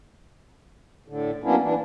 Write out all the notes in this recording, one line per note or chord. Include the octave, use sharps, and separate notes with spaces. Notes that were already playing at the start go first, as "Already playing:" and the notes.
A2 D3
F#3 A#3 B3 C#4 D4 E4
E3 D4